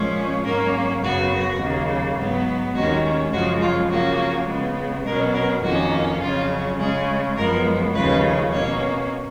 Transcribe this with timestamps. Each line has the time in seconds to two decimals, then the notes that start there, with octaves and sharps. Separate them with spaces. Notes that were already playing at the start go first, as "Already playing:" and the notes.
Already playing: A#2 F3 G#3 C#4
0.44 G#2 F#3 A#3 C#4 A#4
1.02 F#2 C#3 F#3 B3 F#4
1.61 D#2 C#3 F#3 A#3
2.18 G#2 F#3 B3
2.75 D#2 D#3 G#3 C#4 F#4
3.33 F#2 C#3 F3 G#3 C#4 F#4
3.61 F4
3.90 C#3 F3 A#3 C#4 F#4
4.48 C#3 G#3 B3
5.06 B2 F#3 C#4 A#4
5.34 A#4
5.64 F2 D#3 A#3 C#4 F#4
6.22 F2 C#3 F#3 C#4 F4
6.79 C#3 G#3 C#4 G#4
7.36 F#2 F3 G#3 B3 A#4
7.94 D#2 C#3 F3 G#3 C#4 B4
8.52 B2 A#3 C#4 C#5